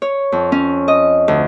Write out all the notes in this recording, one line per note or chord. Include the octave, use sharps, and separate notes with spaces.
C#5
F2
C#4
D#5
D2